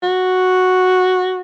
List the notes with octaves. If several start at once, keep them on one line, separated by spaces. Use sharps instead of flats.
F#4